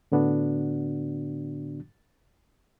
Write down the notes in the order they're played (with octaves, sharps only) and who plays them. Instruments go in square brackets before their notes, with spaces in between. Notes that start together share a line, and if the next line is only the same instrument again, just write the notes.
[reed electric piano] A2 D3 B3 D4 F#4